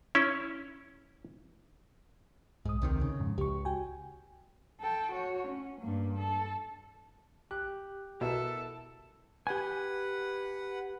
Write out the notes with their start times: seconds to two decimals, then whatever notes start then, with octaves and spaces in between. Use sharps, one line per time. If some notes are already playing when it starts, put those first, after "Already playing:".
0.15 C#4 E4
2.65 B1 G#2 D#6
2.82 D2 C3 D#3
3.01 C#3
3.20 F2 G#2
3.38 C#2 G4 C#6
3.65 F#4 G5 G#5
4.81 A4 G5
5.13 F#4 C#5
5.48 C#4
5.81 G2 A#3
6.18 A4
7.51 G4 F#6
8.21 B2 E4 A4 A#4 E5
9.47 G4 B4 F#5 G#5